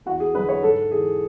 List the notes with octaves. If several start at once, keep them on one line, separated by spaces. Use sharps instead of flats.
E2 F#4
G#4
D3 F#3 B4
C#5
G#2 A4
E3 G#4